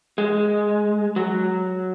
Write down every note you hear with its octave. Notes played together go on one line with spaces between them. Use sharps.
G#3
F#3